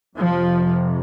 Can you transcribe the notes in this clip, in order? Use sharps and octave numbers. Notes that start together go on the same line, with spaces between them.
F2 C3 F3